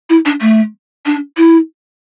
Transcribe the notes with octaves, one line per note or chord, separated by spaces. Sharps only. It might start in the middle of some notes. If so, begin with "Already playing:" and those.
E4
D4
A3
D4
E4